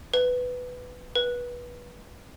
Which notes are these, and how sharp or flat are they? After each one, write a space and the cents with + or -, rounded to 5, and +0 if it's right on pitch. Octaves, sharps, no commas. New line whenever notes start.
B4 +10
B4 -20